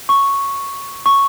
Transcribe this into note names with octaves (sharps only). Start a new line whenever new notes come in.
C#6
C#6